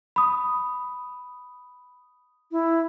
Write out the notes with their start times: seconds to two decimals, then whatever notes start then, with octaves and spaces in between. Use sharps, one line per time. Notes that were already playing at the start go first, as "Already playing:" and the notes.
0.16 B5 D#6
2.52 E4